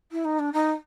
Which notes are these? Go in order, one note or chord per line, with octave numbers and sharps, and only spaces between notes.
E4
D#4
D4
D#4